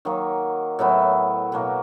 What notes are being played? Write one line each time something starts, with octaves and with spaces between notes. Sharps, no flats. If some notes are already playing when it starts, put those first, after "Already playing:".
D#3 F#3 A#3 D#4
A2 F#3 B3 E4
B2 F#3 A#3